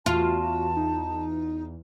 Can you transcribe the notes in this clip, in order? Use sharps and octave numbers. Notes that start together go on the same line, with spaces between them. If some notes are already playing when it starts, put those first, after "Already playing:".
E2 F4 F#4 A5
D#4